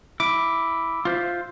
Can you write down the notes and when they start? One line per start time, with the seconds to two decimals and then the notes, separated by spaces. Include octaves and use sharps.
0.20 E4 D6
1.05 F4 C5 E5